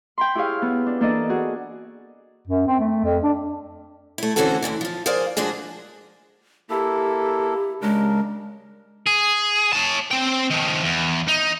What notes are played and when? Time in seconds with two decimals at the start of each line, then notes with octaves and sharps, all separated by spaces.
0.18 G5 B5 C6
0.35 E4 G4 G#4 C#5 F5
0.62 B3
0.87 D4
1.00 E3 A#3 D4 A4 D5 D#5
1.29 F#4 G#4
2.47 F#2
2.67 C4
2.79 A3
3.04 F2
3.23 D4
4.18 A3 E4
4.36 D3 E3 C4 C#4 F#4 A4
4.62 D2 G#2 D3 E3
4.81 F3 F4
5.06 G#4 A#4 C5 D5 F5 G#5
5.37 F3 G#3 D4 F#4 G#4
6.70 A#3 E4 G4 A4
7.82 C#3 G#3 D4 A#4
9.07 G#4
9.73 C#5 A5
10.11 C4 G5
10.51 D#3 F3
10.83 E2
11.28 D#4